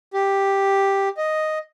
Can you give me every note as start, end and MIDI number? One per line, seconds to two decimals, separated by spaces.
0.14 1.09 67
1.17 1.59 75